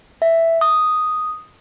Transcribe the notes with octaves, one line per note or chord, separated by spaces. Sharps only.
E5
D#6